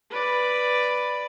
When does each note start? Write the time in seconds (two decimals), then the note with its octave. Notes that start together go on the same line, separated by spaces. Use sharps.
0.11 B4 D5